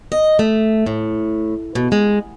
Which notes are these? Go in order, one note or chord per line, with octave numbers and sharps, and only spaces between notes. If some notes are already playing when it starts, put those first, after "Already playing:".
D#5
A3
A2
B2
G#3